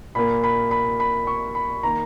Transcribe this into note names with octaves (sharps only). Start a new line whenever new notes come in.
A#2 A#3 B5
B5
B5
B5
C#6
B5
D#3 A#3 A#5